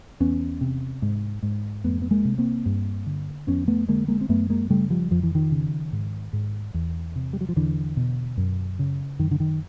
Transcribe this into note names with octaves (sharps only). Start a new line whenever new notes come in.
E2 B3 C#4
C3
G#2
G#2
F2 A3 B3
B3
G#3 A#3
C3
A#3 C4
G2
D3
F2 B3 C#4
A3 B3
D3 G#3 A#3
G#3 A#3
C4
F#2 A3 B3
G#3 A#3
C#3 G3 A3
F3 G3
F2 F3
E3
D#3 F3
C#3
G#2
G#2
E2
C3
G3
F#3
F3
E2 D3 E3
B2
F#2
C#3
F#2 D#3
D3
D#3